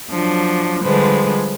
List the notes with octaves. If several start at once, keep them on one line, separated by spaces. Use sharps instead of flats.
F3 F#3 D4
D3 F3 G3 G#3 B4 C5